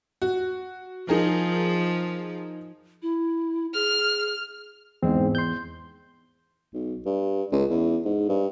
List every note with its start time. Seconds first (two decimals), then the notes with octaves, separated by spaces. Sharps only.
0.22 F#4
1.09 F3 D#4 G#4 A#4
3.02 E4
3.74 G#4 F6
5.03 E2 G#2 G#3 C4
5.35 C6 G6
6.74 B1
7.06 G2
7.52 C#2
7.70 E2
8.05 G#2
8.28 G2